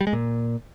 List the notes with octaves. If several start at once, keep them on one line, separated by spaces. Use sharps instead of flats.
G3
G#3
A#2